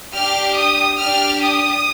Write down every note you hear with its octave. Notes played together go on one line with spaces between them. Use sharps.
D4 G4 F6
D#6
D4 G4 F6
D#6